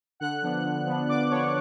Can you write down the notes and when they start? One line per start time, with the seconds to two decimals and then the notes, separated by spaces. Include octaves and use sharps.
0.20 D3 F#5 F#6
0.42 F3 B3 D4
0.64 D3
0.86 F3 B3 D4
1.08 D3 D5 D6
1.30 F3 B3 D4 C#5 C#6